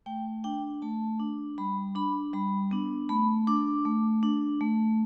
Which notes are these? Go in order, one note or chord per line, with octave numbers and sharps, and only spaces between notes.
A3 G5
D4 G5
A3 A5
D4
G3 B5
D4 B5
G3 B5
B3 D4
A3 B5
D4 D6
A3
D4
A3